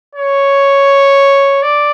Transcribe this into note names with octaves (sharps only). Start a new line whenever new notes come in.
C#5
D5